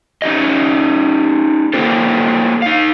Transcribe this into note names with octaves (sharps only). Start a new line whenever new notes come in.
C#4 D#4 E4 G4 D#5
A#3 F4 G4 A4 C5
D#4 F5